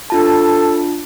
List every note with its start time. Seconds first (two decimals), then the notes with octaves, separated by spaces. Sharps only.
0.10 D4 F4 A4 A5